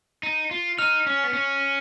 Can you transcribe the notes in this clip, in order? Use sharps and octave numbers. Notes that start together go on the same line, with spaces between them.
D#4
F4
D#4 F6 F7
C#4
B3
C#4